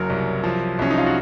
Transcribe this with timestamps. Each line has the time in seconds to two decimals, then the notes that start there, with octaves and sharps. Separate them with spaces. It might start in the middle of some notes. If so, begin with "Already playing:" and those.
Already playing: F#1 F#3 A#4
0.10 C2
0.44 F3
0.79 C2 C#4
0.90 D#4
0.98 F4
1.06 F#4